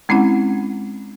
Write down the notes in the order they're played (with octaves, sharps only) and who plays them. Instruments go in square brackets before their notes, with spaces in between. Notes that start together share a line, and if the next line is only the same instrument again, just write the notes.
[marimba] G#3 C4 C#4 E4 F#5